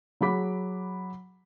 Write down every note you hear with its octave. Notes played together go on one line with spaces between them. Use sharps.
F#3 G#4 F#5 B5 D6 B6